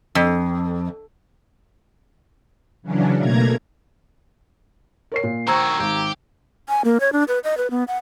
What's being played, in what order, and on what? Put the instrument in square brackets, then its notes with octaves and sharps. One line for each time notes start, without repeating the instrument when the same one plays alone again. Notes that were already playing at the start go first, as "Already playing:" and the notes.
[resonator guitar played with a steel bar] F2
[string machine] C#3 E3 F#3 C#4 D4
B2 A3 A#3 A#5 G#6
[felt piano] A#4 C#5 C7
A#2
[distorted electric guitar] D#3 F#4 [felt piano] C5 G5 C#6 [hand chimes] A#5 E6 G#6
[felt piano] G#1 [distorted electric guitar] G4
[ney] G#5
A#3
C#5
D4
B4
D#5
B4
B3
F#5